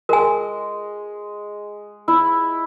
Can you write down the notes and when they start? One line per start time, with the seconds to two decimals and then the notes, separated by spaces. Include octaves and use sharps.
0.09 G#3 A#4 G#5
2.08 E4